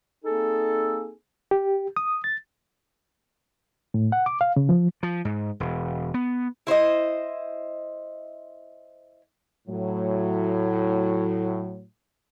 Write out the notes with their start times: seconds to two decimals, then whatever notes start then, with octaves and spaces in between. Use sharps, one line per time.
0.25 A#3 C4 D#4 G#4 A4
1.51 G4
1.96 D#6
2.24 A6
3.94 A2
4.12 F#5
4.26 D6
4.41 F5
4.56 C#3
4.69 F3
5.03 F3
5.25 G#2
5.60 E1
6.14 B3
6.67 E4 C5 C#5 D#5
9.68 A2 F#3